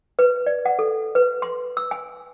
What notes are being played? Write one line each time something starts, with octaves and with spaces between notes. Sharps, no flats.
B4
D5
F#5
A4
B4
C6
E6
G#5